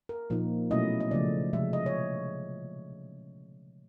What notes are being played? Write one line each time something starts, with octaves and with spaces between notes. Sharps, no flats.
A#4
A#2 F3 A#3 D#4
B2 F#3 A3 C#4 E4 D#5
D#5
C#3 F3 A3 D5
C3 F3 G#3 E5
D#5
C#5